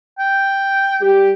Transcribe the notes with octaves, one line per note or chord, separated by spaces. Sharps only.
G5
G3 G4